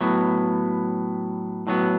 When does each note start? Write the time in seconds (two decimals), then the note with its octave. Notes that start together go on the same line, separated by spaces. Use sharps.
0.01 A2 F#3 B3
1.67 A2 F#3 B3